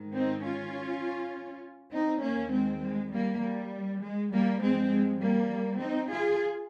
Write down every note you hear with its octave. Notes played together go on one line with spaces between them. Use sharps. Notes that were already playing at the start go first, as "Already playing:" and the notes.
Already playing: G#2 D#3
C4 D#4
C#4 F4
C4 D#4
D#2 D#3 A#3 C#4
G#3 C4
G#3
G3 A#3
G3
G#3
G3 A#3
G2 F3 G#3 C4
G#3
G3 A#3
C4 D#4
F4 G#4